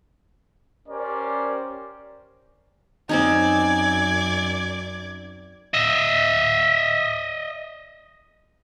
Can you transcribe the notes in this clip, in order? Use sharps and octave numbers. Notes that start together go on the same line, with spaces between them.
C#4 G4 A#4 C5 D5
F#2 C4 C#4 D#4 D5 G#6
D#5 E5